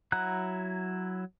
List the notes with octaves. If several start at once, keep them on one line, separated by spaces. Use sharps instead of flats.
F#3 E4 F#5 A#5 F#6